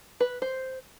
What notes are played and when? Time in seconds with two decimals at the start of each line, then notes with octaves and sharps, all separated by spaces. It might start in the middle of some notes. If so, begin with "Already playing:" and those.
0.20 B4
0.42 C5